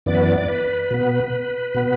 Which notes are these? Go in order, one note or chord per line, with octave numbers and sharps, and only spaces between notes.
F#2 E3 B3 D5
B4
D5
D5
B4
B2 B3
B2 B3